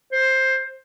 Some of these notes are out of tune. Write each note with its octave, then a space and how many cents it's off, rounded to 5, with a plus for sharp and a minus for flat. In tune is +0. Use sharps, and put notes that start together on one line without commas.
C5 +10